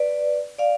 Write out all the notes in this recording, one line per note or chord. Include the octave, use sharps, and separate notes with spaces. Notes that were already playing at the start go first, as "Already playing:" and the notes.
Already playing: B4 D5
D5 F5